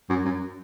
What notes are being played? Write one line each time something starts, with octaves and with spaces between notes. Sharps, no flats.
F#2
F#2